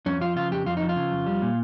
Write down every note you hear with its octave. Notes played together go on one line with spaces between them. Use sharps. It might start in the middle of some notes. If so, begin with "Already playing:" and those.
F2 C#4
F3 F4
C#3 F4
F2 G4
F2 F4
F3 D#4
F4
C#3
F2
G3
A#2